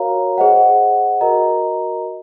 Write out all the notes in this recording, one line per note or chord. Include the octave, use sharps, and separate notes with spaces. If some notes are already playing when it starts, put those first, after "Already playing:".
Already playing: F#4 A#4 C#5 F5 A#5
G#4 C5 D#5 F#5
F#4 A#4 D#5 A#5